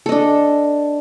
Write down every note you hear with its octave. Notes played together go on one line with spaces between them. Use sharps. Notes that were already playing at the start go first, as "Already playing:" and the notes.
D4 A4 D#5